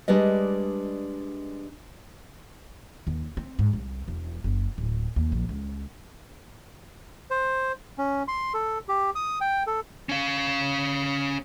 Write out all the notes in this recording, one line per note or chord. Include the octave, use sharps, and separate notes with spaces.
G3 G#3 D4 B4 D#5
D#2
C4
G#2
C2
E1
F#1
D1
D#2
A#1
C#2
C5
C#4
C6
A4
G4
D#6
G5
A4
C#4 F5